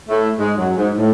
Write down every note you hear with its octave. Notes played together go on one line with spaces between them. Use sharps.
A2 A3
G#2 G#3
F#2 F#3
G#2
A2